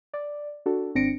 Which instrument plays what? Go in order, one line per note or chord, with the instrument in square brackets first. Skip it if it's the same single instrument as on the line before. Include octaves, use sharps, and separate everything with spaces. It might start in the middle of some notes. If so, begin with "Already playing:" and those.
[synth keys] D5
D4 F#4 A4
G#1 C4 D4 A#6 C#7 D7